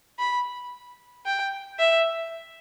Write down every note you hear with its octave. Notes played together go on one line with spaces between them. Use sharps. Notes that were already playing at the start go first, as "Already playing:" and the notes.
B5
G5
E5